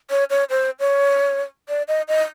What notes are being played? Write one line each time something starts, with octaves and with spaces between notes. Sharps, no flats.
C#5
C#5
C5
C#5
D5
D#5
D#5